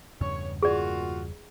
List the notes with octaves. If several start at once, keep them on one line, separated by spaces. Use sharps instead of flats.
E2 G2 C#3 C#5
A#2 F4 F#4 G#4 D5